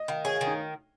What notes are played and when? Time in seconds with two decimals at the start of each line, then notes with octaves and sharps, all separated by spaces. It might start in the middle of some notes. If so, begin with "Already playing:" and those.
Already playing: D#5
0.08 D#3 F5
0.25 G#4 C#5
0.35 F5
0.41 D#3
0.47 D#4